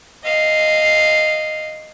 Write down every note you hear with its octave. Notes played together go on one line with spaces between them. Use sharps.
D#5 F5